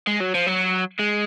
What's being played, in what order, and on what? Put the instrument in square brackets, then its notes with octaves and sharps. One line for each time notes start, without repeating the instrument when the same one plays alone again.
[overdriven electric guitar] G#3
F#3
F3
F#3
G#3